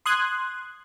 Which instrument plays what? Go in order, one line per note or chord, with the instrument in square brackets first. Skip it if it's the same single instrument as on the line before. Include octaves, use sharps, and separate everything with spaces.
[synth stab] C6 D#6 F#6 G#6